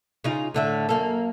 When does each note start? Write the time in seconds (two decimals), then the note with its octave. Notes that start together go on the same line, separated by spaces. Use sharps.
0.24 C#3 D#4 F4
0.54 A2 D3 E5
0.89 F#2 A#3 A4